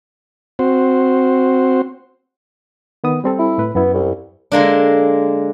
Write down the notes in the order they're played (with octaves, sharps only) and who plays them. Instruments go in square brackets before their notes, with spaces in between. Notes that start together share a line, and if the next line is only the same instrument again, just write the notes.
[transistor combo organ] C4 F#4 C5
[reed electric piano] D#3 B3 D#6
G3 C4 A4
[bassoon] E4
[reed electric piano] A2 B4
[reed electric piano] F#2 E4 [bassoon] B3
[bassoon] C2
[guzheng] D3 G#3 A#3 D4